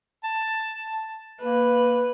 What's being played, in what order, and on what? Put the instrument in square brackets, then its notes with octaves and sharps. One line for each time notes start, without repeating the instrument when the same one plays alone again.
[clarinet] A5
[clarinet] A#3 [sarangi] B4